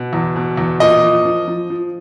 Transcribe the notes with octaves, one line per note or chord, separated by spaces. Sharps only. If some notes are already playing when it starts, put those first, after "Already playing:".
Already playing: B2
E2
B2
E2
A#2 D#5
F3
F3
F3
F3